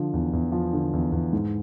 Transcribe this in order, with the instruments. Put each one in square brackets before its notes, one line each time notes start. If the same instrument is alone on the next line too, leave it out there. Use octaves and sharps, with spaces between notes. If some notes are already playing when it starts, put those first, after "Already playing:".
Already playing: [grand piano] D3 F3
E2
E2
F3
D3
E2
E2
G#2